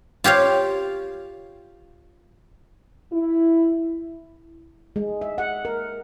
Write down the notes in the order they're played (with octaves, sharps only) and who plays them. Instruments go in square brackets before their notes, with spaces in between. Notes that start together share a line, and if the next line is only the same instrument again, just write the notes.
[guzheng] F4 G4 C#5 F5
[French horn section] E4
[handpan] G#3
E5
F#5
A#4